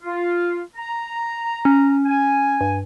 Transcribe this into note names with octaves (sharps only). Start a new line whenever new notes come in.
F4
A#5
C#4
G#5
G2